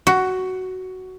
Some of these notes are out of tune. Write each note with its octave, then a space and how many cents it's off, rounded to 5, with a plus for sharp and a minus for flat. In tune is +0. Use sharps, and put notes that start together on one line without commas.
F#4 +10